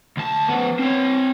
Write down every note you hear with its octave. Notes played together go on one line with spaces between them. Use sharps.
D2 A5
F3 B3
C4 C#5